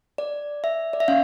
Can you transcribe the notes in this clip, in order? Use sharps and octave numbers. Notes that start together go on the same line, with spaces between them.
D5
E5
D5
E5
C#4 F5